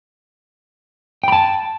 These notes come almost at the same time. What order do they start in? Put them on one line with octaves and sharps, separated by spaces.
G5 B5 A5